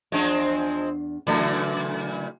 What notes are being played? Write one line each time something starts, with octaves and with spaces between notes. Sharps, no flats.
E2 F3 G#3 C4 D4 D5
A#2 C#3 E3 F#3 A3